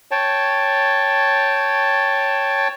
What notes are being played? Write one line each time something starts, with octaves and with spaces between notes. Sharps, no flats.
C#5 G5 A5